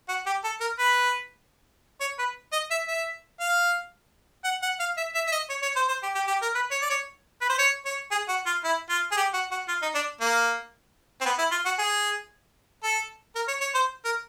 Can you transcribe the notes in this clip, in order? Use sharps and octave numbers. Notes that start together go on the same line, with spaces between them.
F#4
G4
A4
A#4
B4
C#5
B4
D#5
E5
E5
F5
F#5
F#5
F5
E5
E5
E5
D#5
C#5
C#5
C5
C5
G4
G4
G4
A#4
B4
C#5
D5
C#5
B4
C5
C#5
C#5
G#4
F#4
F4
E4
F4
G#4
G4
F#4
F#4
F4
D#4
D4
A#3
C4
B3
E4
F4
F#4
G#4
A4
A#4
C#5
C#5
C5
A#4